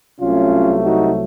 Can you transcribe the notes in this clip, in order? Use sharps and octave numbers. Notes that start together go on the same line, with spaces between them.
C2 C3 F#3 A3 C#4 F4
D#4 F#4